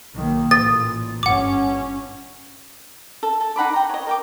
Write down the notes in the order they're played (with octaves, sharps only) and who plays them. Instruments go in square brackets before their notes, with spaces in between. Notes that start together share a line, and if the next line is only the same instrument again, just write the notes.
[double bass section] B1 D#3 A#3
[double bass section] A1 A#2 [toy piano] A4 [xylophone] A6
[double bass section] G1 G2 C#4 [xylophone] F#5 D6
[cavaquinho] A4
A4
D#4 F#5 B5 D6
G5 A#5
C#5 D#5
A#4 G5 D6